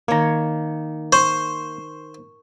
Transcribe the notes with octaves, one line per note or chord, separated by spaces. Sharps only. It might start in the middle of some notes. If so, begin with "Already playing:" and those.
D#3 A#3 C#5 A#5
C5 C#6